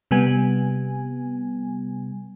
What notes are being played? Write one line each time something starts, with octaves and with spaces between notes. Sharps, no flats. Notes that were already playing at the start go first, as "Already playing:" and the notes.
C3 G3 B3 G#5